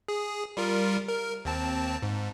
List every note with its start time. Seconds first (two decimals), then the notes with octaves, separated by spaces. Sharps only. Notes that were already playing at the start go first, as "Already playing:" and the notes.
0.08 G#4
0.57 G3 F4 A#4
1.08 A#4
1.45 D#2 C4 A5
2.02 G#2